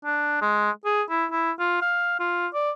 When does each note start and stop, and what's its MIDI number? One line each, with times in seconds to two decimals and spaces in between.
0.05 0.37 62
0.41 0.70 56
0.85 1.02 68
1.10 1.26 64
1.31 1.52 64
1.59 1.80 65
1.81 2.18 77
2.20 2.47 65
2.54 2.71 74